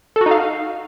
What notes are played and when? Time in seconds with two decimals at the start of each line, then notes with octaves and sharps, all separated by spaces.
0.16 A4
0.21 F#4
0.26 D#4
0.31 F5